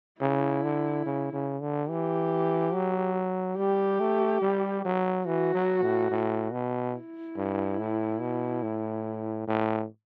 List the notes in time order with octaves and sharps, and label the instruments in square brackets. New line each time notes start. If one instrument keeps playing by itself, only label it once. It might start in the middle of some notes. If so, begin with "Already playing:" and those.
[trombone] C#3 [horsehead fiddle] E4
[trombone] D3
C#3
C#3
D3
[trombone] E3 [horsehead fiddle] G4
[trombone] F#3
[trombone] G3 [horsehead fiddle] G4
[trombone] A3
G3
F#3
[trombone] E3 [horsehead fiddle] F#4
[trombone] F#3
A2
A2
B2
[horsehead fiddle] E4
[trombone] G2
A2
B2
A2
A2